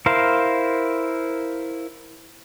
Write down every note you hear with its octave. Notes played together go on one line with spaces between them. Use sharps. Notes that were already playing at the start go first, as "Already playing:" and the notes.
E4 A#4 C5 F5